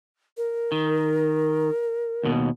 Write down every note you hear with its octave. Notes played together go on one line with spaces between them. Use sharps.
A#4
D#3
D#2 B2